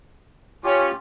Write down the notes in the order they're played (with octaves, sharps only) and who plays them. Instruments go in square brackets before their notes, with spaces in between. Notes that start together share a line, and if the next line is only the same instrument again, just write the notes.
[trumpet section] C#4 [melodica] F4 G4